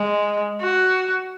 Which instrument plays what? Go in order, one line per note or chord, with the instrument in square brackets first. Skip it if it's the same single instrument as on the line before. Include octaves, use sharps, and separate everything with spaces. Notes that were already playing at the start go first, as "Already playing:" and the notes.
Already playing: [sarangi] G#3
F#4